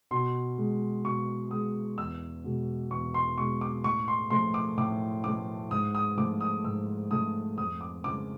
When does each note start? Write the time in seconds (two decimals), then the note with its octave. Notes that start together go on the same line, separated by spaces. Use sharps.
0.11 B2 C6
0.58 G#3
1.04 B2 C#6
1.51 G#3 D#6
1.98 E2 E6
2.44 B2 G#3
2.91 E2 C#6
3.14 C6
3.38 B2 G#3 C#6
3.61 D6
3.84 A2 C#6
4.08 C6
4.30 F3 A3 C6
4.54 D6
4.77 A2 D6
5.24 F3 A3 D6
5.71 G#2 D#6
5.95 D#6
6.17 F3 A3 D6
6.41 D#6
6.64 G#2 E6
7.11 F3 A3 D#6
7.58 F2 D#6
7.81 D6
8.04 C#3 F3 G#3 D6